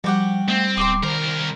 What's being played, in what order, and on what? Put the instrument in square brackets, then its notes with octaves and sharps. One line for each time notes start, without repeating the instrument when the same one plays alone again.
[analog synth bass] F3 [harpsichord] G3 [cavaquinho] F#4 G4 F#5
[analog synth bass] A3 [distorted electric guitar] C4
[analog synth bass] D1 [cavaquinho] C6 D6 D#6
[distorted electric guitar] C2 A#4 [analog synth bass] D#3 [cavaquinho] C5